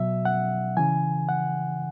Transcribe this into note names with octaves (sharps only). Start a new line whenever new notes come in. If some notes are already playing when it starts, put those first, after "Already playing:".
Already playing: B2 F#3 E5
F#5
C#3 E3 G#5
F#5